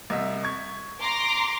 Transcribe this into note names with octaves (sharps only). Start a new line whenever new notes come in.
C2 D#5 E5
C#6 G#6
A#5 C6 D6